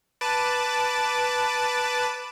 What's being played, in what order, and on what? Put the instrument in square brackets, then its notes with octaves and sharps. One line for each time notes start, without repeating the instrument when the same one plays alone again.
[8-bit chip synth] B4 A5 D6